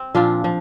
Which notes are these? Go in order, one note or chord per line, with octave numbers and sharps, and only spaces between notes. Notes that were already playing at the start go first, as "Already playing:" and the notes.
Already playing: C4
A#2 F3 D4 F4
F3